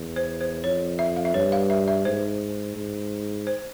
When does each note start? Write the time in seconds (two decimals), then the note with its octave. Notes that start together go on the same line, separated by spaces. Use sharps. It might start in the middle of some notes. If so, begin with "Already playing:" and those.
Already playing: E2
0.16 C5
0.41 C5
0.64 F2 C#5
0.99 E5
1.16 F5
1.25 E5
1.34 G2 C#5
1.52 F5
1.70 E5
1.88 E5
2.05 G#2 C5
2.76 G#2
3.47 C5